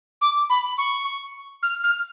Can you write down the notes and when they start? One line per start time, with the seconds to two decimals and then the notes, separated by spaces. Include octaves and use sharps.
0.21 D6
0.50 B5
0.78 C#6
1.63 F6
1.84 F6